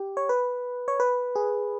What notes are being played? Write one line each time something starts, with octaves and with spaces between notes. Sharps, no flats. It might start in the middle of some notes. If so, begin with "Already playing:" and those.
Already playing: G4
C#5
B4
C#5
B4
G#4